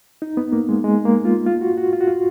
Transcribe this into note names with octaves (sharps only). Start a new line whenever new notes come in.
D#4
B3
A#3
G#3
G#3
A#3
F4
F4
F#4
F#4
F4
F#4
F4